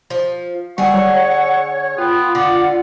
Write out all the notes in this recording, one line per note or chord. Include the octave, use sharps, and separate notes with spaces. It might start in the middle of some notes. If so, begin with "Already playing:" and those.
F3
D3 G3 G#4 F#5 C#6
C#5
B3 F4 G5
D3 D5 F#5